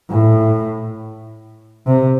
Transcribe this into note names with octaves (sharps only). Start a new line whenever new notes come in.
A2
C3